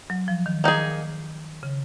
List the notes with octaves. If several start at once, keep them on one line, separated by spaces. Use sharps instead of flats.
F#3
F3
D#3
A#3 D#4 G#4
C#3